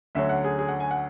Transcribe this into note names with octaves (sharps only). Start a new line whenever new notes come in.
D2 D3 F#3 C#4 E5
F#5
G#4
G#4
F#5
G#5
F#5